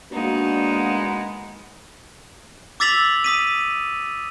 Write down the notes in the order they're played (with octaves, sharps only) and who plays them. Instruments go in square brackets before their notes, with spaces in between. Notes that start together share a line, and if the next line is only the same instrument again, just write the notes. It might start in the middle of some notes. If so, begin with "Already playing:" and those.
[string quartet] G#3 B3 D#4 [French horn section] A#3 D4 F#4
[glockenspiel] D6 E6 A6 B6 F7 F#7
D#6 B6 D#7